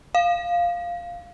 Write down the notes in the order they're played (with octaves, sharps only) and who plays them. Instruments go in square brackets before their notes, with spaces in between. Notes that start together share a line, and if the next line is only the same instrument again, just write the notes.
[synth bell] F5